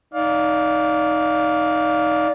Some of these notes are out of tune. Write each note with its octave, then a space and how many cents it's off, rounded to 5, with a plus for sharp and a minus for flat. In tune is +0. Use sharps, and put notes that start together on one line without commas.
D#4 +0 D5 -20 F5 +15